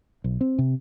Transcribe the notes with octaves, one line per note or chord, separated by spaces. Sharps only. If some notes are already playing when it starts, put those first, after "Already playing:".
B1
C4
C3